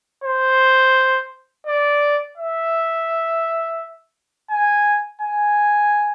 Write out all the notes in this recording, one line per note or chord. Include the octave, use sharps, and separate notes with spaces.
C5
D5
E5
G#5
G#5